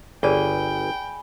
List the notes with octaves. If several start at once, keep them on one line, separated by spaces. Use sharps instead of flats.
G1 G#4 D5 G5 G#5 B5 G7